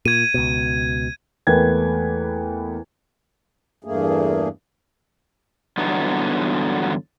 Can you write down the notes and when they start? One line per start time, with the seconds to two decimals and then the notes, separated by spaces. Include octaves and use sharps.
0.05 A#2 G#6 D#7
0.34 C#2 B2
1.47 E2 A3 A#3 B4 G5 G#6
3.84 E2 G2 A3 A#3 G#4
5.78 E2 G2 D3 F#3 B3 D#4